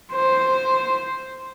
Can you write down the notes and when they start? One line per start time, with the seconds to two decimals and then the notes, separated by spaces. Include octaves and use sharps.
0.12 C5